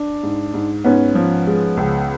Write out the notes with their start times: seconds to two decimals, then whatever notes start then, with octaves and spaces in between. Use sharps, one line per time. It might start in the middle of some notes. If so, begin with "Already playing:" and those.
Already playing: D4
0.23 G#2
0.54 G#2
0.84 G#2 B3 C#4
1.15 F3
1.47 G#3
1.77 C#2